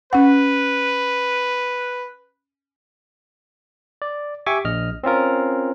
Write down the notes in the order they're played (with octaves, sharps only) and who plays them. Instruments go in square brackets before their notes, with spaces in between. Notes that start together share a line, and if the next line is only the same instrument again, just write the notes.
[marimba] C#4 F#5 [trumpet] B4
[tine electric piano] D5
G4 E5 G#5 C#6 D6
A#1 D#5 F6
C4 C#4 F4 A#4